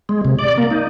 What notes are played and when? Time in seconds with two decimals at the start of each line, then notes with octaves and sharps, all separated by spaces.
0.09 G#3
0.25 C3
0.39 D5
0.58 A#3
0.71 D#4